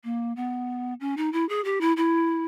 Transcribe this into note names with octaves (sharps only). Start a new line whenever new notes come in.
A#3
B3
C#4
D#4
E4
G#4
G4
E4
E4